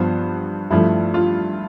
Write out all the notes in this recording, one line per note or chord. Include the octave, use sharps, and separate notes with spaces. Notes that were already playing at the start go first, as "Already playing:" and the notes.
Already playing: G2 F3 B3 C5
G2 F3 A3 E4
F4